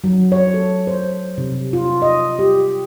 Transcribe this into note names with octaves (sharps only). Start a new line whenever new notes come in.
F#3
C#5
A4
C5
C3
F4
D#5
G4